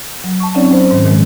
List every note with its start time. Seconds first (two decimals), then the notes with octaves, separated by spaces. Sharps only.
0.24 F#3
0.40 A5 C#6
0.55 F#3 C4 C#4 D#4 C#5 D5
0.71 F#3 C5
0.91 G#2 D#3
1.05 A#2 D#3 F3 G#3